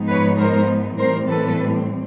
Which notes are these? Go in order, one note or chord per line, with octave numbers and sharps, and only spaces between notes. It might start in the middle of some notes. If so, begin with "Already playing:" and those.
Already playing: G#2 F3 G#3 B3 D#4
B4 C#5
A#4 C5
A2 E3 G3 C4 A#4 C5
A4 B4